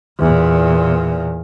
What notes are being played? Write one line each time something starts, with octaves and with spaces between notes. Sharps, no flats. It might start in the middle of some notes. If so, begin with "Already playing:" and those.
E2 A#2